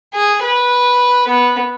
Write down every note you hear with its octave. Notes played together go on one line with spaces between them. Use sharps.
G#4
B4
B3